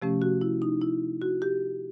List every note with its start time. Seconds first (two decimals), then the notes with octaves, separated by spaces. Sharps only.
0.02 C3 F3 A3 C#4 G4
0.22 F#4
0.41 E4
0.62 D#4
0.82 E4
1.22 F#4
1.42 G4